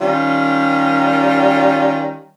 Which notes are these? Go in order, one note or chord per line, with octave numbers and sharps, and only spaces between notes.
D#3 G3 C#4 F4